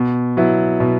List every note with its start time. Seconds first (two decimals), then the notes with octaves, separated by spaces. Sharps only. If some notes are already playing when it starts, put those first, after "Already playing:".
Already playing: B2
0.37 F#3 B3 E4
0.80 B2